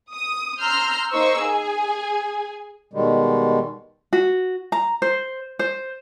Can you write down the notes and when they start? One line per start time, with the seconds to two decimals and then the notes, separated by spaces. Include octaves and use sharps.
0.13 D#6
0.59 A#5 C6 E6 F6 G6
1.11 A#3 D#4 C5 C#6 E6
1.42 G#4 G#5
2.93 B2 D#3 G3 G#3
4.13 F#4
4.72 A#5
5.02 C5
5.59 C5